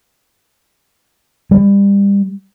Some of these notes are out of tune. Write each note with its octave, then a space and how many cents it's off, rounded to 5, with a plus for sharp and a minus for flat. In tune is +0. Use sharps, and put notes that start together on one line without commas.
G3 +30